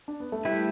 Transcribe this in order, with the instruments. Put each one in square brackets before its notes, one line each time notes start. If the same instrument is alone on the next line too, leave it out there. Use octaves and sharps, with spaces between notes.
[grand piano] D4
B3
A3
[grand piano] G3 [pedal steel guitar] A3 E4 G4 B4